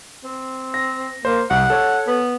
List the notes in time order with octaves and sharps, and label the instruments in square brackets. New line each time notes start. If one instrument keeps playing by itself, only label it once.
[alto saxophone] C4
[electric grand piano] A#6
[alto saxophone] A#3 [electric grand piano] C5
[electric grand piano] C2 [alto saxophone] F#5
[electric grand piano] A4 C#5
[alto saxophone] B3